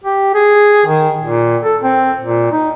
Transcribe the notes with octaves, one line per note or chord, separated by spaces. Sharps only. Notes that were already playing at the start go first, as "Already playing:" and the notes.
G4
G#4
D#3
A#2
A4
C4
A#2
D#4